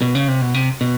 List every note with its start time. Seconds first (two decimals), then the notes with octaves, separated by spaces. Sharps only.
0.02 B2
0.15 C#3
0.28 C3
0.41 B2
0.54 C3
0.81 B2